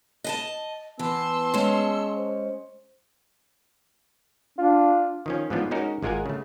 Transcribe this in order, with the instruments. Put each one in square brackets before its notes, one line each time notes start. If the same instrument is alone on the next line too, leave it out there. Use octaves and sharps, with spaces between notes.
[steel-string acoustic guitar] D#5 G#5 A5
[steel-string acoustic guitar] E3 [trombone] B3 [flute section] A5 C6 E6
[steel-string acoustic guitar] G#3 C#4
[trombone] C5
[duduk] D4 [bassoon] F4
[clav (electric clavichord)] D#3 F3 C#4
G#2 E3 F3 B3 D4
G#3 C#4 D#4 F#4 A#4
G#1 G#3 F4 A#4 F#5 G#5
C#3 A3